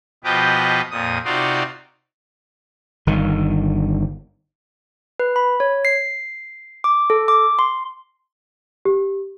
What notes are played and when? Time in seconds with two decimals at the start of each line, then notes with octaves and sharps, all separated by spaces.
0.24 B2 F3 G4 B4 D#5 G5
0.90 F2 A#2 D#6
1.25 C3 D#4 F4 F#4 D5 C6
3.07 G1 D#3
5.20 B4
5.36 B5
5.60 C#5
5.85 C7
6.84 D6
7.10 A4
7.28 D6
7.59 C6
8.85 G4